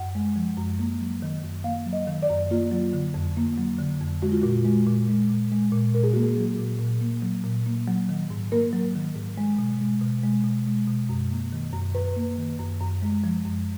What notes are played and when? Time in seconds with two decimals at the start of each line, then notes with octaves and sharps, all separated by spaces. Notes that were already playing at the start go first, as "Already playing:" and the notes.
Already playing: F#2 F#5
0.15 G#3
0.36 F3
0.57 F#2
0.79 A#3
1.01 F#3
1.22 D#3
1.43 F#2
1.64 A#3 F5
1.86 F#3
1.93 D#5
2.07 D#3
2.22 D5
2.29 F#2
2.51 A#3 F4
2.71 F#3
2.93 D3
3.14 F2
3.37 A#3
3.58 F#3
3.79 D3
4.01 F2
4.22 G#3 F#4
4.32 F4
4.42 A#2 F#4
4.65 G#3
4.87 A#2
5.09 G#3
5.30 A#2
5.52 G#3
5.72 A#2
5.94 A#2 A#4
6.03 G#4
6.13 A#3 F#4
6.23 G#4
6.37 F#3
6.58 A#2
6.79 A#2
7.01 A#3
7.22 F#3
7.44 A#2
7.66 A#3
7.88 F#3
8.09 D#3
8.30 G#2
8.52 A#3 A#4
8.73 F#3
8.95 D#3
9.16 G#2
9.37 G#3
9.59 B2
9.81 G#3
10.01 B2
10.23 G#3
10.44 B2
10.67 G#3
10.88 B2
11.09 F#2
11.31 A#3
11.52 D#3
11.73 F#2
11.95 F#2 B4
12.16 A#3
12.38 D#3
12.59 F#2
12.81 F#2
13.02 G#3
13.24 F3
13.45 F#2